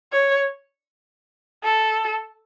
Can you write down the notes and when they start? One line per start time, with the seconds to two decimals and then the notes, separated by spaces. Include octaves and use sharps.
0.12 C#5
1.63 A4